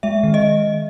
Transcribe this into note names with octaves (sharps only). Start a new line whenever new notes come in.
G#3 E5
D#3
D#5